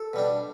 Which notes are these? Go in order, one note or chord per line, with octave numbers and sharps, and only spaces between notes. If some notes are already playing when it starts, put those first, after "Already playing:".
Already playing: A4
B2 G3 D4